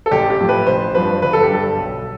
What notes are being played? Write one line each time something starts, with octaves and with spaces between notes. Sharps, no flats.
A4
A1 G4
G4
A2 F3
B4
A1 C5
G2 F3 B4
G1 B4
A4
G4
G2 D3 A4
B1